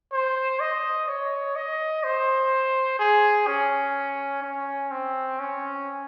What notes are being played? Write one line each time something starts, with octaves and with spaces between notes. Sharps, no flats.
C5
D#5
C#5
D#5
C5
G#4
C#4
C#4
C4
C#4